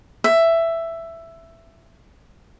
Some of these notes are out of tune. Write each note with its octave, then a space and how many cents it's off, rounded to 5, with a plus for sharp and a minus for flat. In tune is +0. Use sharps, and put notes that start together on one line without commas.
E5 +10